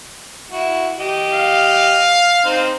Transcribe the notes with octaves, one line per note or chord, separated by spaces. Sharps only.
E4 F#4
G4 D#5
F5
C4 D#4 C5